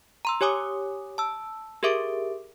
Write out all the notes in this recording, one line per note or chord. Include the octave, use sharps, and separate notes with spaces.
A#5 C6 E6
G4 C#5 G#5 D6 D#6
A5 E6
G4 G#4 A#4 E5 D6 D7